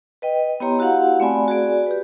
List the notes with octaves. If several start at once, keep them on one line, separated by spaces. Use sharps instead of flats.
B4 D#5 G5
B3 E4 G4 C#5 A#5 C6
E4 F#4 G4 F5 F#5
A3 C4 D5 G#5 B5
F#4 G#4 D5
G4 B4